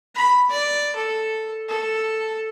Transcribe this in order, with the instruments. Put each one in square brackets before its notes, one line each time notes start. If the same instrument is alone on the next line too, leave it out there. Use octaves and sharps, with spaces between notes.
[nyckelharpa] B5
D5
A4
A4